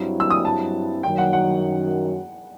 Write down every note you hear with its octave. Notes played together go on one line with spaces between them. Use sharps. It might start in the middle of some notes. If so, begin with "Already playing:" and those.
Already playing: G2 F#3 C4 E4
E6
D#6
A5
F#2 D#3 F#3 G5
F#5
F#5